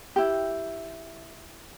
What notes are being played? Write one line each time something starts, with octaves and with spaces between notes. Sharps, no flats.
E4 G4